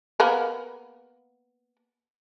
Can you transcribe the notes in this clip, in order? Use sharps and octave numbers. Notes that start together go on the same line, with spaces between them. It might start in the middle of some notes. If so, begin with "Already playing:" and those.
A#3 B3 A#4